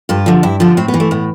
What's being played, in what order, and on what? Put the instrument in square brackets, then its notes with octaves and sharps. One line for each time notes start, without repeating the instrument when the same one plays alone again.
[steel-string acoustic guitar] G2 F4
D3 F3
G2 E4
D3 F3 D4
A2 C4
B3
E3
A3
A2 B3